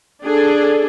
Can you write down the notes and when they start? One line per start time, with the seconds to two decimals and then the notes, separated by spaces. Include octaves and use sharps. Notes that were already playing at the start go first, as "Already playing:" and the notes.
0.24 D4 G#4 A4